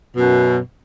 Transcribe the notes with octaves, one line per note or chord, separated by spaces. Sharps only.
F#2 B2